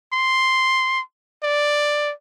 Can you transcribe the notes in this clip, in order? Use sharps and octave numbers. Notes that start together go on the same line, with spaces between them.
C6
D5